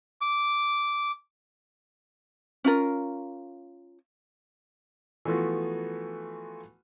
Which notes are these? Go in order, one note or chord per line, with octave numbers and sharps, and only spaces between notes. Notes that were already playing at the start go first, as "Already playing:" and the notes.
D6
C#4 F4 A#4
E3 F3 A3 B3 F4 F#4